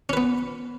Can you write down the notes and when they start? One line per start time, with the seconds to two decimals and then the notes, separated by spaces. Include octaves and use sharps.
0.09 C#4
0.13 B4
0.17 B3